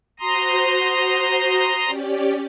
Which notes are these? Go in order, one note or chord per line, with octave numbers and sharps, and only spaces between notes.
F#4 C5 A#5 C6 D#6
C#4 G4 D5